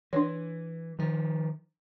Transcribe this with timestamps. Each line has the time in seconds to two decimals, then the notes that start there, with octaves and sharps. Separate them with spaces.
0.13 E3 D4 C#5
0.99 D#3 F3